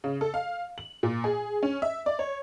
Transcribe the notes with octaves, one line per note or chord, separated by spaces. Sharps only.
C#3
A4
F5
F#7
A#2
G#4
C#4
E5
D5
C#5